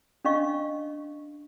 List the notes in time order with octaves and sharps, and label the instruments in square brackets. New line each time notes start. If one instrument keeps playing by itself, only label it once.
[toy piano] C#4 D4 D#5 F5 C#6